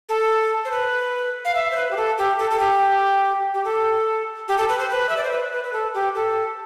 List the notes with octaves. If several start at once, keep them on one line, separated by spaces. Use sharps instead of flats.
A4
C5
B4
F5
E5
C5
B4
G4
A4
G4
A4
A4
G4
G4
A4
G4
A4
B4
C5
B4
E5
D5
C5
B4
B4
B4
A4
G4
A4